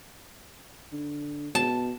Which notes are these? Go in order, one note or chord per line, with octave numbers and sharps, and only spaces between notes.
D3
B2 A5